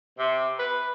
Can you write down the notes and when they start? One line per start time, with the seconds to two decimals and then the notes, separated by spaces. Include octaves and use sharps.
0.18 C3
0.58 B4